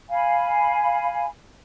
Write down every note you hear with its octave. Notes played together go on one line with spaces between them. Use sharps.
F5 G#5 B5